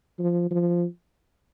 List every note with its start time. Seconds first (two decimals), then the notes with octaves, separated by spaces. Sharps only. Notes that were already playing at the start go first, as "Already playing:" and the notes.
0.19 F3
0.51 F3